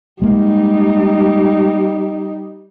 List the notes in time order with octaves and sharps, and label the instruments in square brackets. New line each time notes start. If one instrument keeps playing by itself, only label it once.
[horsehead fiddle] G3 D#4 [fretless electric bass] G#3 A#3